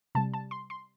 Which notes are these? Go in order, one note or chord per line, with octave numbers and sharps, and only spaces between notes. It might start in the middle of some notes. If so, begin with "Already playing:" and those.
C3 G3 A5
A5
C6
C6